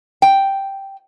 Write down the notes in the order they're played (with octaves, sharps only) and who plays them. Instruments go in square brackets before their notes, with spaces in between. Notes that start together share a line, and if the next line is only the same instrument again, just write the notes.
[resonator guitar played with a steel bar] G5